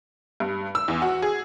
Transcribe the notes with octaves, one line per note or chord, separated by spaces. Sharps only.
G2
E6
E2
F#4
G#4